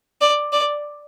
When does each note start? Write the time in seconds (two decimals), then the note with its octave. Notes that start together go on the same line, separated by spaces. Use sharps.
0.21 D5
0.52 D5